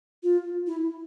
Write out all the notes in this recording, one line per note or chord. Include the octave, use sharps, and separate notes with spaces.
F4
E4